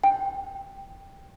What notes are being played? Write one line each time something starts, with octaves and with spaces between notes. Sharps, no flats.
G5